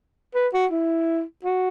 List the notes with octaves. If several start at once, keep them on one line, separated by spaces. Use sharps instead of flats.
B4
F#4
E4
F#4